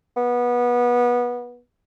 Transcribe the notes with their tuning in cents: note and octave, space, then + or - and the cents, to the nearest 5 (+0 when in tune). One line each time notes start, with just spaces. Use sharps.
B3 -20